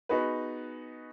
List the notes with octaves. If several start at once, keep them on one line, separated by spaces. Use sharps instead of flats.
B3 D#4 F#4 G#4 B4